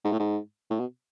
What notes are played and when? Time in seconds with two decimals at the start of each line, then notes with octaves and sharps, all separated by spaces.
0.04 G#2
0.12 A2
0.19 G#2
0.70 A2
0.80 B2